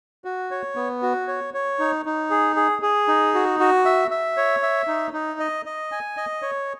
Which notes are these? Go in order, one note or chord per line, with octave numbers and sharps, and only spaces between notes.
F#4
C#5
B3
F#4
C#5
C#5
D#4
D#4
G#4
G#4
G#4
D#4
F#4
F#4
E5
E5
C#5
E5
D#4
D#4
D#5
D#5
G#5
D#5
C#5